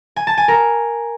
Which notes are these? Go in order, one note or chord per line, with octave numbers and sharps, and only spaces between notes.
G#5
A5
G#5
A#4